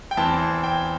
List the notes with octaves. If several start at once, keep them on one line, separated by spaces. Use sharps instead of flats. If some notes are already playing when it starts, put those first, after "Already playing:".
G5
E2 E3 C4 A5
G5